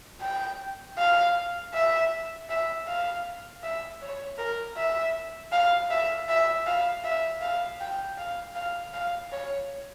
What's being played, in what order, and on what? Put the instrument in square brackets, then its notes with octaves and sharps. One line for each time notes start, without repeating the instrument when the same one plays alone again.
[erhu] G5
F5
E5
E5
F5
E5
C#5
A#4
E5
F5
E5
E5
F5
E5
F5
G5
F5
F5
F5
C#5